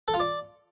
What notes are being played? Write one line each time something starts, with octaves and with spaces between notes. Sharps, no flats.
A4
F4
D5